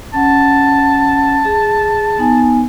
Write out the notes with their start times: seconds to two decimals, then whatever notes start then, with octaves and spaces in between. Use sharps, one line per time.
0.14 C#4 F#5 A5
1.45 G#4
2.18 B3 D#4 G#5